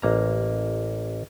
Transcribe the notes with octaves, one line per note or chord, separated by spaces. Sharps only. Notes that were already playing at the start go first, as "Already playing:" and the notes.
A1 A#3 A#5